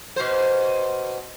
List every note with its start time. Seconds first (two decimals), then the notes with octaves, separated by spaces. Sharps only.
0.16 B2 C5